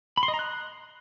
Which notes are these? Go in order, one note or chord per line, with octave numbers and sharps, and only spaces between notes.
B5
C6
D#5
A#5
F#6